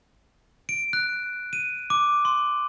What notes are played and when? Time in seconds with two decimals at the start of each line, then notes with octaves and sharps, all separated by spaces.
0.69 D7
0.93 F#6
1.53 D#7
1.90 D6
2.25 C6